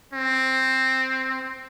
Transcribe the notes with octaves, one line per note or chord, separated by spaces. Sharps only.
C4